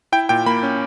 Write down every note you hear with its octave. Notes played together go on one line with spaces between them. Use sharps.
E4 G5
A#2 G5
A#3 B5
C#4